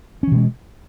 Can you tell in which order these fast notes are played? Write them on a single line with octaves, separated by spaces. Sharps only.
C#4 E3 B2 G#3